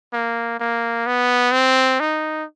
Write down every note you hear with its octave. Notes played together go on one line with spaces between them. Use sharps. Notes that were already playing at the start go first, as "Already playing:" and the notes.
A#3
A#3
B3
C4
D#4